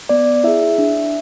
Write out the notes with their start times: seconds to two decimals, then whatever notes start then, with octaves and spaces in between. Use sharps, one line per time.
0.09 B3 D5
0.44 E4 G#4 E5
0.78 D4